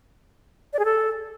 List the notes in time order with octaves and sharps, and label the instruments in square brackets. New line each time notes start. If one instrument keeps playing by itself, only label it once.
[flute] D5
G#4
A4